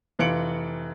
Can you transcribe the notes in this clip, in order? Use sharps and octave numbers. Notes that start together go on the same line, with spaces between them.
F1 E3 F4 C#7 D7 F#7